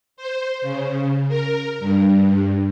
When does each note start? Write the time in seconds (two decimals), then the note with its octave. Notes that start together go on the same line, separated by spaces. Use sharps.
0.17 C5
0.62 C#3
1.28 A#4
1.79 G2